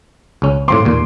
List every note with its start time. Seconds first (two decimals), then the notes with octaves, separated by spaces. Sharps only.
0.42 C#2 C#4
0.68 A2 F3 C4 C6 D6
0.85 D#2 A#2